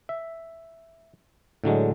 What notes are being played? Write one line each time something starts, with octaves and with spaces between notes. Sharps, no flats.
E5
A2 D3 F#3 G#3